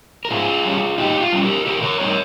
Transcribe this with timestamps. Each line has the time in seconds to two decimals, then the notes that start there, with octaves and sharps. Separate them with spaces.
0.25 A#4
0.31 G#2 F4 G#4
0.65 G3 C#4
0.98 G#2 D#4 G4
1.20 F4
1.32 G3 C#4
1.44 G4 A#4
1.66 C#3 G4 A#4
1.82 A#4 C#5
2.00 G3 C4 D#4 A#4 C#5